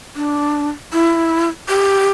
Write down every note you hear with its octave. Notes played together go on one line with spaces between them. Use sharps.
D4
E4
G4